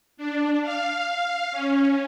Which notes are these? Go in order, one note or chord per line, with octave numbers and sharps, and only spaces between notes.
D4
F5
C#4